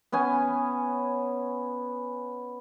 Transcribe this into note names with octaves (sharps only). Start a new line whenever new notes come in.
B3 C#4 G#5